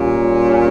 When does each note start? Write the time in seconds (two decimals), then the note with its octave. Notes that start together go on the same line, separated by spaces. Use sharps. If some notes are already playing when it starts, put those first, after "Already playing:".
Already playing: A#2 G3 C#4